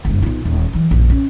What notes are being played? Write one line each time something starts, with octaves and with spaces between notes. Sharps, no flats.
F#1 G2
B1 F4
D#1
E3 F#3
A#1 F#2
C#4